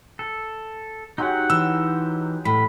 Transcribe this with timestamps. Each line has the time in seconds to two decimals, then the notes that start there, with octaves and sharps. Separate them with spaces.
0.19 A4
1.18 F#3 G#3 D#4 G4 F#5
1.50 E3 E6
2.45 A2 B5